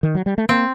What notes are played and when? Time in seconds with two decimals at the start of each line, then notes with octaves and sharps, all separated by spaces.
0.03 D#3
0.15 F#3
0.26 G3
0.38 A3
0.49 A#3 C4